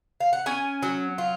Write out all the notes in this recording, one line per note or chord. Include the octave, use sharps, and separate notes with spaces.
F5
F#5
C#4 G#5
F#3
F4